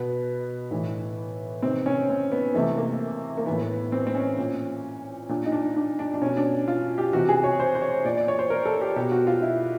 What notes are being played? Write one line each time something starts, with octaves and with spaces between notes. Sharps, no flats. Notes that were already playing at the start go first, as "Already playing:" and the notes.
Already playing: B2 B3
A2 E3
C3 D#3 C4
C#4
C4
B3
C3 E3 A3
A#3
A#3
A2 E3 B3
B3
C4
C4
C#4
A#2
A#2 D4
D#4
D4
D4
D4
D4
B2 C#4
D4
F4
G4
C3 E3 F#4
G#4
C#5
C5
C5
C#5
A#2 D5
D5
C#5
C5
A#4
A4
G4
B2 G4
F#4
F4
E4